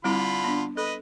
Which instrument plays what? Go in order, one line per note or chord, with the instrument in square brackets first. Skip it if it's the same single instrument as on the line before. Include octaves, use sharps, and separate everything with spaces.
[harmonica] D3 F4 B5 [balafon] G3 C4 E4
[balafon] B3 D4
[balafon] A4 [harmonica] B4 D#5